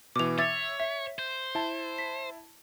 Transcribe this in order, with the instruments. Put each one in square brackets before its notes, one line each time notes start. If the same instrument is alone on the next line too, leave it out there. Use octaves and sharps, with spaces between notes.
[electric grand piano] B2 E3 [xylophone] D6 F7
[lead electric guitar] C#5 [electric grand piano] E5 D6 [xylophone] A6
[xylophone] E5 [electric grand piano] B6
[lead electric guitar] C5
[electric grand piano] E4 A5
[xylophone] B6